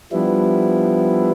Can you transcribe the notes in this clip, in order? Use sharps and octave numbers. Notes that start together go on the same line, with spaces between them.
F3 G3 B3 D4 E4